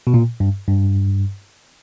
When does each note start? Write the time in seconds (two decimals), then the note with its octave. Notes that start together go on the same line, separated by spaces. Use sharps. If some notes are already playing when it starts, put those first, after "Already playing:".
0.07 B2
0.14 A#2
0.40 G2
0.68 G2